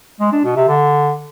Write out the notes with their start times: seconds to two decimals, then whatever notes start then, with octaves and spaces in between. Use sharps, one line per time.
0.20 G#3
0.32 D4
0.44 B2
0.56 C3
0.68 D3